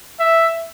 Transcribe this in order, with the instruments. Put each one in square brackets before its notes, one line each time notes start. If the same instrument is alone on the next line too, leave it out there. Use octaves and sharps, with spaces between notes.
[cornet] E5